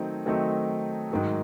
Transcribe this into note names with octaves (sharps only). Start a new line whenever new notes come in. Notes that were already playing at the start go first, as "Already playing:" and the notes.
Already playing: D#3 F#3 A3 C4 D#4
D#3 F#3 A3 C4 D#4
G#2 D#3 F#3